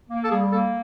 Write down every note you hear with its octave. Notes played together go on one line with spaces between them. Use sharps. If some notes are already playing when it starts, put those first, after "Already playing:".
A#3
A4
G3 G#4
A#3 A4